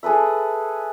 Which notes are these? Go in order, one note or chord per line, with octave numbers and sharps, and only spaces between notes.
G#4 A4 B4 E5